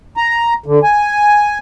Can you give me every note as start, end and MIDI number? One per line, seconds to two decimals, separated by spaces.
0.17 0.54 82
0.66 0.79 50
0.83 1.58 80